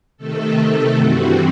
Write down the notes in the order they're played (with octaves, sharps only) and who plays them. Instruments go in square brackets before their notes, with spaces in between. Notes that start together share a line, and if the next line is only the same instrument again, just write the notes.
[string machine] C3 D#3 A3 A4
A4
G2 E3 G3 C4 F#4